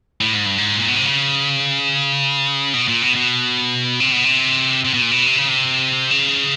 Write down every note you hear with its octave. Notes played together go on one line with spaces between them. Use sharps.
A2
G#2
G2
G#2
A#2
B2
C3
C#3
B2
A#2
B2
B2
C3
B2
C3
C3
B2
A#2
B2
C3
C#3
C3
C#3